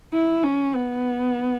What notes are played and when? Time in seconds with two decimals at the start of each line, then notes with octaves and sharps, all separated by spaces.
0.13 E4
0.43 C#4
0.75 B3